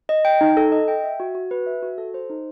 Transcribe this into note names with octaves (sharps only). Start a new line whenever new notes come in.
D#5
G5
D#4
A4
D#5
G5
E5
F#4
F#4
B4
E5
F#4
A4
C5
D#4